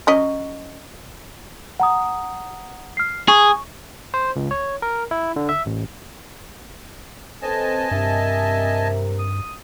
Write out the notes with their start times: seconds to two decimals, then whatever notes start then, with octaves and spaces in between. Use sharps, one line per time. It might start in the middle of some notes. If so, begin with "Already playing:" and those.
0.07 F#3 C#4 D#5
1.80 F#5 A#5 D#6
2.97 F6 C7
3.28 G#4 C#6
4.14 C5
4.36 C#2
4.51 C#5
4.82 A#4
5.11 E4
5.36 D3
5.49 E5
5.66 A1
7.42 C4 A4 B4 C5 D#5 G#5 A5
7.91 G2 C3 A#4 E5
9.19 D#6